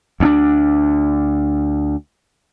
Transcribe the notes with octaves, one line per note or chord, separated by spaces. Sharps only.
D2 C#4 D4